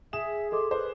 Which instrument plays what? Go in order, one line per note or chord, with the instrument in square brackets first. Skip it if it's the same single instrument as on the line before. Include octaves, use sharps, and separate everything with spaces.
[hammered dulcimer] G#4 [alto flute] E5 [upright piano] E7
[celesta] A4 D#5 D6 [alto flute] C6
[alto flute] B4 [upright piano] C5